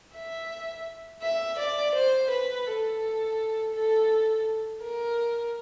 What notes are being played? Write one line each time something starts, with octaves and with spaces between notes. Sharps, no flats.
E5
E5
D5
C5
B4
A4
A4
A#4